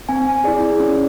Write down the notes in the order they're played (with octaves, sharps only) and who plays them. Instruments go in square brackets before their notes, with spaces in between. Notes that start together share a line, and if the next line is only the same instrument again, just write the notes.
[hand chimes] C4 G#5
E4 G#4 D5
C#4